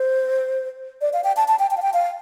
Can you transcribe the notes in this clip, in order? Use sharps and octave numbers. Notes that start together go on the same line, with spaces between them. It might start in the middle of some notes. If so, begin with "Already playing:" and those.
Already playing: C5
D5
F5
G5
A5
A5
G5
G5
F5
G5
F5